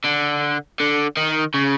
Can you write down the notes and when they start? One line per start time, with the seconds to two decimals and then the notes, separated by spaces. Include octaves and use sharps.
0.05 D3
0.80 D3
1.17 D#3
1.55 C#3